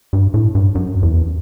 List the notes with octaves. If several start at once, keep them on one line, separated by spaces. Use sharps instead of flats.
G2
A2
G2
F#2
E2